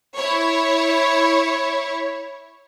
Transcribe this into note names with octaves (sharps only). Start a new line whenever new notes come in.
E4 C#5